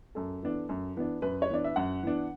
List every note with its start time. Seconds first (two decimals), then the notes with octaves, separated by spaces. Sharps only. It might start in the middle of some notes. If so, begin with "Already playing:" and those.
0.15 F#2 A4
0.43 E3 B3 D4
0.69 F#2
0.96 E3 B3 D4
1.22 F#2 B4
1.42 C#5
1.50 E3 B3 D4 D5
1.64 E5
1.76 F#2 F#5
2.03 E3 B3 D4